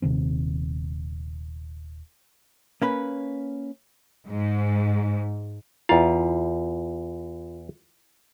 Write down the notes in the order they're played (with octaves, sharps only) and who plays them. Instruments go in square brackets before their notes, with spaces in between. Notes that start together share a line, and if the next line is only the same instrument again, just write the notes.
[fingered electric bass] D#1 C3 D#3 C4
[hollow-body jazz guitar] A#3 C#4 B4
[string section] G#2
[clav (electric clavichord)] E2 F5 [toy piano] E4 [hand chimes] F4